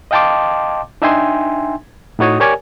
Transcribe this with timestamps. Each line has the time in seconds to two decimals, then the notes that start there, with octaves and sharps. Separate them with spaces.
0.11 D#5 F5 G5 A5 C6 D6
1.02 D4 D#4 E5 G5 G#5 C6
2.19 A2 D#4 F#4 C#5 D#6
2.40 G4 A#4 C#5 D5 G#5